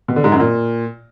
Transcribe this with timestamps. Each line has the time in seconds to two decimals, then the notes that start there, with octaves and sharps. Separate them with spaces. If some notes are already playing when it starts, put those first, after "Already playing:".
0.08 B2
0.16 D3
0.24 G#2
0.32 F#2
0.40 A#2